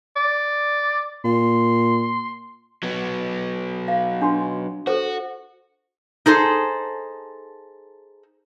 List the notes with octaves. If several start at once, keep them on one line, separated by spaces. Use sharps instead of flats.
D5
A#2 C6
F#3 B3
F5
D4 F#4 C6
F#4 A4 C5
D#4 G#4 A4 C5